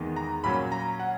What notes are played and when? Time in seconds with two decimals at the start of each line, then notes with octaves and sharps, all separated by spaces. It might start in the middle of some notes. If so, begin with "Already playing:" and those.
Already playing: E2 D#3 G#3 B3
0.16 A#5
0.44 A#2 F#3 C#4 B5
0.72 A#5
1.00 F#5